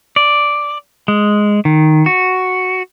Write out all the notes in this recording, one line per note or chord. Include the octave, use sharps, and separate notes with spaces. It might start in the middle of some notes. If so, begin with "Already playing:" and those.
D5
G#3
D#3
F#4